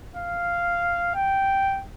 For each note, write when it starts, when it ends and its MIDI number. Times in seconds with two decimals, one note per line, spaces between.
0.16 1.12 77
1.15 1.82 79